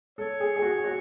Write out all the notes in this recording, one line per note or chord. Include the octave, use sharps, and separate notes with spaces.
A4 C#5
G#4
G#4
F#4
F#4